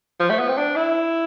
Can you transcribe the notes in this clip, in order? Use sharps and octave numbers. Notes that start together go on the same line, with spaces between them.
F3
A3
B3
C4
D4
E4